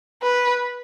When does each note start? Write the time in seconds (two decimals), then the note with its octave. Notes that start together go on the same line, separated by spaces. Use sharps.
0.23 B4